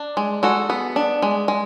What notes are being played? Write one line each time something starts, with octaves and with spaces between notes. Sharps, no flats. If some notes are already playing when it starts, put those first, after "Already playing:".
Already playing: D4
G#3
G#3 F#4 A4
B3
D4
G#3
G#3